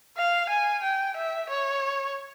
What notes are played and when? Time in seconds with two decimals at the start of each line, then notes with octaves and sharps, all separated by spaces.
0.18 F5
0.50 G#5
0.83 G5
1.17 E5
1.50 C#5